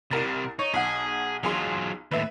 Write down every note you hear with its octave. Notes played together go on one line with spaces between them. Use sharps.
C2 C3 G3 A#4 A6
D#4 C#5
B1 G#4 F#5
B1 F#3 F4 G#4 C6
D#2 A2 B4 E5